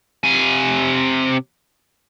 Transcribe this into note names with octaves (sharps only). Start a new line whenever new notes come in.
C3 G#5